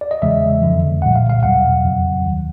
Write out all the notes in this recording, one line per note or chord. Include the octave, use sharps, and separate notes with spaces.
D5
D#5
E2 C#3 E3 G#3 E5
F2 D3 F3
C2 A#2 G3 F#5
F5
F5
E2 B2 F#3 F#5
F2 C#3 F#3
D#2 D#3 G3